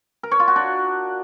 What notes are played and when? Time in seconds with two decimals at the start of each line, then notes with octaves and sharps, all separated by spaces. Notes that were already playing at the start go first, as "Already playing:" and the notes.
0.23 A#4
0.31 C#5
0.40 F4
0.48 F#4
0.56 D4